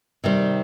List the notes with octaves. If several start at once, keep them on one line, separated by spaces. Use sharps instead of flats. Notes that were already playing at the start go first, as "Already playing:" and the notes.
C3 D#3 G3 C4